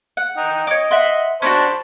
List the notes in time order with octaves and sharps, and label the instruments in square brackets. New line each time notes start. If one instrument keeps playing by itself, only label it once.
[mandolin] F#5
[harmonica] D#4 G5
[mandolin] C#5 D6 [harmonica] D#5
[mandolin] E5 F#5 C6
[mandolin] C#4 D4 F#4 [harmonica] C5 A5 B5